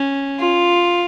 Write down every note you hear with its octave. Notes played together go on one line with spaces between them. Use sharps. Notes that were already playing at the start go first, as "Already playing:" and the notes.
Already playing: C#4
F4